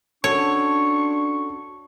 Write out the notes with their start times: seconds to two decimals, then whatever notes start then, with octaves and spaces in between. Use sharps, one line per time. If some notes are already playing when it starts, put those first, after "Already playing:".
0.24 C#4 D4 F#4 A4 C#5 C#6